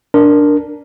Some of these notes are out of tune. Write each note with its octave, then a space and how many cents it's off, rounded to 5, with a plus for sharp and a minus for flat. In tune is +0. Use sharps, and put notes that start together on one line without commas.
D4 +0 A#4 +0